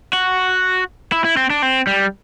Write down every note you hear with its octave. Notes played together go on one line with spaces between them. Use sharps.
F#4
E4
E4
C4
D4
C4
G3